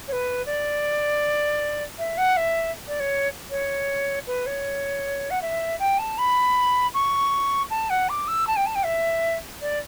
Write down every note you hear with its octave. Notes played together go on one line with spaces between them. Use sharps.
C#5
B4
D5
E5
F#5
E5
D5
C#5
C#5
B4
C#5
F#5
E5
G5
A5
B5
C#6
A5
F#5
D6
E6
A5
G5
A5
G5
E5
D5